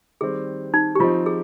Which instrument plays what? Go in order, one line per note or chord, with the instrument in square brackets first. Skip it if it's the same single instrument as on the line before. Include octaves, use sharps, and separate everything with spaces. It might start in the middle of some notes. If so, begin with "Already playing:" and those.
[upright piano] D#3 G3 C4 [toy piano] G#4
[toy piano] D#4
G4
[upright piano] F3 C4 D#4 [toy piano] F4
[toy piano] G#4